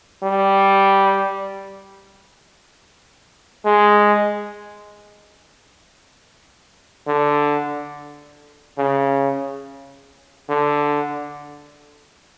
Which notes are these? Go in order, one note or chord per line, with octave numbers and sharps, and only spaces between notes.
G3
G#3
D3
C#3
D3